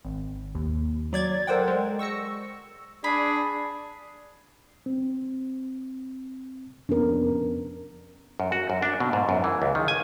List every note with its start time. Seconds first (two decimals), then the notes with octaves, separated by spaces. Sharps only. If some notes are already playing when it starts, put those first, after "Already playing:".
0.05 G#1
0.55 D#2
1.13 F#3 D5 G#6 A6
1.47 A4 A#4 C5 D5 F#5 G5
1.68 G#3
1.99 C#6 E6 A#6 C#7
3.04 D4 G#4 B5
4.86 C4
6.89 F2 B3 C#4 D4 A#4
8.40 F#2
8.52 F#4
8.70 F#2
8.82 D4
9.00 B2
9.13 G#2
9.29 F#2
9.44 E3
9.62 C#2
9.75 D#3
9.88 G#5